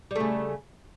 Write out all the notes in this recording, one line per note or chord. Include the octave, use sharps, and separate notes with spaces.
C#3 G3 A3